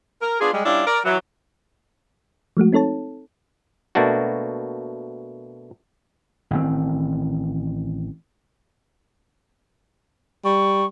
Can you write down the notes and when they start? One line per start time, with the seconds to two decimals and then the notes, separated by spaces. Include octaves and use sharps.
0.22 A#4
0.40 B3 D4 F4 G#4
0.53 G3 G#3
0.66 G3 C#4 D4 E4 F4
0.87 A#4 D5
1.05 E3 F#3
2.57 F3 G#3 A3 F#4
2.73 C4 D#4 A4 C#5 A5
3.95 B2 A3 A#3 D4 F#4
6.51 A1 D#3 C4
10.44 G3 C#6